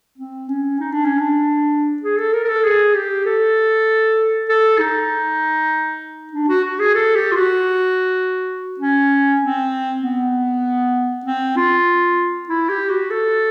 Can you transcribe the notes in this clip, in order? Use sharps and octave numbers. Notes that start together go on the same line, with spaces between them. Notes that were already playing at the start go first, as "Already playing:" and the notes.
C4
C#4
D#4
D4
C#4
D4
G#4
A4
A#4
A#4
A4
G#4
G4
A4
A4
D#4
D4
F#4
F#4
G#4
A4
G4
F4
F#4
C#4
C4
B3
C4
F4
E4
G4
F#4
A4